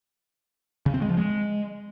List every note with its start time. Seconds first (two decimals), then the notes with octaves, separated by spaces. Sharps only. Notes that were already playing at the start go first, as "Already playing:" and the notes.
0.86 C#3
0.94 C4
1.02 G#3
1.09 F3
1.17 G#3